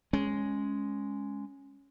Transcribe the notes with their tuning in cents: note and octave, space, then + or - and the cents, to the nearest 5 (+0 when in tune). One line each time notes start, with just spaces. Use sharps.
G#3 +0 C#4 +0